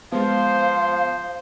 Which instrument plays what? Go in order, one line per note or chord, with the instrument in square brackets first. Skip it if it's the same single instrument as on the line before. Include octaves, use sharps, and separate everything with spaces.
[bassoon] F3 [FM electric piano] G#3 B3 [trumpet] C5 [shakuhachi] F5